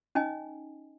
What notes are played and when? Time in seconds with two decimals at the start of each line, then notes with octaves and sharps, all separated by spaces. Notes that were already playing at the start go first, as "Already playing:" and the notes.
0.15 C#4 D#4 D#5 G#5